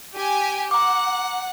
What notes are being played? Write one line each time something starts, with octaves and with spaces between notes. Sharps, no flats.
G4 G#5
F#5 A#5 D6